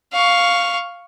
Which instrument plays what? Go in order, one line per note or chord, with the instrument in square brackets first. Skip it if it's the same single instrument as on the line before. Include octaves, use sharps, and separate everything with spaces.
[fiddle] F5 C#6